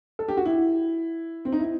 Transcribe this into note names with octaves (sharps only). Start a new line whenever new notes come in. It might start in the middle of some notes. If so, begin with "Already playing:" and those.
A4
G4
F#4
E4
C4
D#4
E4